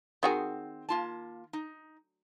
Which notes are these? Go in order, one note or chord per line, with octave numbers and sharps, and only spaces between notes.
D#3 C4 F#4 G#4
A#3 F4 A5
D#4